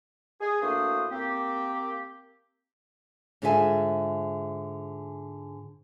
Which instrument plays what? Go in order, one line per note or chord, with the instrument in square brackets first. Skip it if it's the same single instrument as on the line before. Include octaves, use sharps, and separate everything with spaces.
[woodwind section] G#4
A2 A#3 D4 F#4 C5 D#6
A#3 C4 G4
[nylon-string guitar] G#2 D3 F4 G#4 E5 G#5